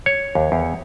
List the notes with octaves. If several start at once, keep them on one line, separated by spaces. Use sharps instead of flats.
C#5
D#2
E2